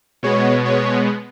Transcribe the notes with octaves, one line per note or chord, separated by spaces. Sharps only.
B2 G#3 B3 C#5
C#5